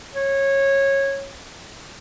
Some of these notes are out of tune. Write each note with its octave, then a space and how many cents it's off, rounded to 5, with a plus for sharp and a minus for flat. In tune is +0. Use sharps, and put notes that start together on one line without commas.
C#5 -15